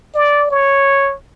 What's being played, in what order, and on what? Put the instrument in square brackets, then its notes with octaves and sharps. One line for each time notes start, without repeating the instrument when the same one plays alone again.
[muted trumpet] D5
C#5